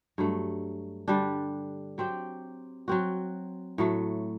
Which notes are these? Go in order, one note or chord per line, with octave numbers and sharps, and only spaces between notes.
G2 F#3 A3
D3 G3 D4
F#3 C4 G4
F#3 C4 F#4
A2 F#3 A3